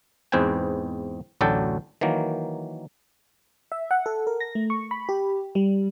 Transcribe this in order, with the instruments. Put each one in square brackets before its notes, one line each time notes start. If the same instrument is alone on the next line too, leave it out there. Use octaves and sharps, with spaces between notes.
[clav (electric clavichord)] E2 G#2 C4 B4 G5 G#5
A1 D2 F#3 A4 D5 G5
D#3 E3 F#3 A#3
[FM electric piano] E5
F#5
A4
A#4
A#6
A3
C#6
B5
G4
G3